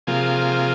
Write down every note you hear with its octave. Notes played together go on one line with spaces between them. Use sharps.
C3 F3 A#3 F4 G#4